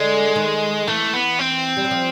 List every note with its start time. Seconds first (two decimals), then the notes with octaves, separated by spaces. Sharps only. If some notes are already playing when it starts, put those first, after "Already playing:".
Already playing: D3 G#3
0.36 D#3
0.88 E3 A3
1.14 B3
1.39 C4
1.77 G3
1.84 F#3
1.91 F3